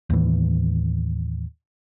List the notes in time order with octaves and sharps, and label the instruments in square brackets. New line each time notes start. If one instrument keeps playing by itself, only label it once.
[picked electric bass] D#2 A2 E3